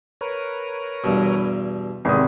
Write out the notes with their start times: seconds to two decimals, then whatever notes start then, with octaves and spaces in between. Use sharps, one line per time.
0.21 A#4 B4 C#5
1.04 E2 G2 B2
2.05 G#1 C3 E3 G#3 B3 D#6